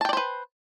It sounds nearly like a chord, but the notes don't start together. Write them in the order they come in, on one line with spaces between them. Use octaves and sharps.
A5 G5 D5 C5 B4